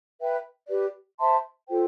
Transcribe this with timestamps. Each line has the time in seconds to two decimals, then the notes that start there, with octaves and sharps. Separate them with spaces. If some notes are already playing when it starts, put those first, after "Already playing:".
0.19 B4 E5 G5
0.69 G4 B4 D5
1.18 C5 E5 A5 C6
1.68 F4 A4 C5 G5